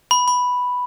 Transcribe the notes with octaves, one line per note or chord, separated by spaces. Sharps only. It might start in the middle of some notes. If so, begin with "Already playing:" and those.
B5
B5